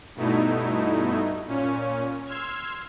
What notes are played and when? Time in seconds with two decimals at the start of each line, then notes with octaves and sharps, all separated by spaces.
0.15 G2 B2 A3 D#4 E4
1.46 A#2 C#4
2.26 C6 E6 F6 G#6